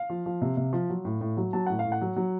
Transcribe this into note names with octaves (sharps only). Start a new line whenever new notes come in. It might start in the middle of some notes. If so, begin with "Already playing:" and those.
Already playing: F5
F3
F3
C3
C3
F3
F#3
A2
A2
F#3
F#3 A5
A2 F#5
F5
A2
F#5
F#3
F#3